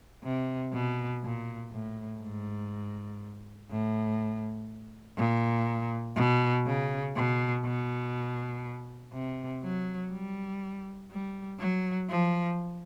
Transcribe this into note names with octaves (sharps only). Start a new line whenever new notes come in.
C3
B2
A#2
A2
G#2
A2
A#2
B2
C#3
B2
B2
C3
F#3
G3
G3
F#3
F3